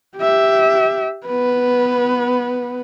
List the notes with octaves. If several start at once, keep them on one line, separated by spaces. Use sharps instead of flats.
G4 E5
B3 B4